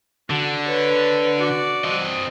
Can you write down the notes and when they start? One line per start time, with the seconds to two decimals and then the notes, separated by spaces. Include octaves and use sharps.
0.30 D3 F#4
0.65 B4 C#5
1.38 F#4 D5
1.84 C4 D#5